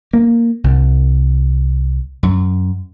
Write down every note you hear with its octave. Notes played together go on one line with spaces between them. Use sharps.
A#3
C2
F#2